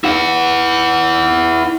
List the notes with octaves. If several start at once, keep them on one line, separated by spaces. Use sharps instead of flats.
E4 F#5